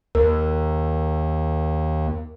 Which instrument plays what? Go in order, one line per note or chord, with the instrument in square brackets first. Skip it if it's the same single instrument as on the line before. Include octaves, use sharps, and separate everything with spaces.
[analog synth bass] D#2 [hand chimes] A#4